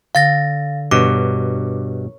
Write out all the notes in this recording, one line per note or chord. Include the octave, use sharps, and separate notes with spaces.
D3 F5 A6 A#6
G2 B2 A#4 C#5 C#6 D6